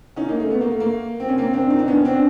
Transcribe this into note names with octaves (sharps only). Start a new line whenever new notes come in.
C#4 D#4
A#3
A3
B3
A#3
A3
A#3
C4
C#4
A#3 C4
C4 D4
D#4
D4
B3 C#4
C4 D4